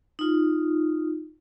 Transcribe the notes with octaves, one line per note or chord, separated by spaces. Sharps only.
D#4 F4